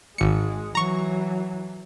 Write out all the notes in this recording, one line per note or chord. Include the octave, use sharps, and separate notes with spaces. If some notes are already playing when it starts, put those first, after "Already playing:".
G#1 G#3 C#7
E3 F#3 A#5 C#6